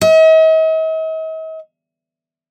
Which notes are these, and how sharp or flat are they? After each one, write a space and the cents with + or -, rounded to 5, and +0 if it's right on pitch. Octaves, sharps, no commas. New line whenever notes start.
D#5 +45